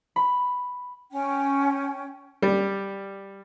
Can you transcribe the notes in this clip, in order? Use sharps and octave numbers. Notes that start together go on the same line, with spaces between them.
B5
C#4 G5
G3